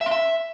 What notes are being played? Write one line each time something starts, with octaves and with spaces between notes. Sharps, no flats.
E5
C6
E5